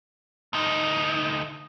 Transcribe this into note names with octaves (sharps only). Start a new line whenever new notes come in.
D2 D#4